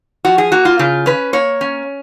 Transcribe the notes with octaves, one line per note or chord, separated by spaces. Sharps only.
F3 F#4
G#4
A#3 F#4
F4
C#3 F4
C#4 B4
A#3 C#5
C#4